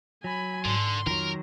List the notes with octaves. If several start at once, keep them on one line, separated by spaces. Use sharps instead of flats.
F#3 G#5 B5
G#2 D3 C6
F2 D#3 F#3 F4 A#4